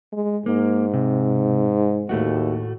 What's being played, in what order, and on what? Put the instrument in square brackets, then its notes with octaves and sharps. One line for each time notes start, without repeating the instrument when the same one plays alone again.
[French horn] G#3
[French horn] G#2 [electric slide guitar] A#3
[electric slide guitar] C3
[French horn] D#2 [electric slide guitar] A2 A3 F#4